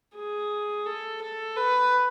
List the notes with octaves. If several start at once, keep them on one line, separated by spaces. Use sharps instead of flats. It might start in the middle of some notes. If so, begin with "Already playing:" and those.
G#4
A4
A4
B4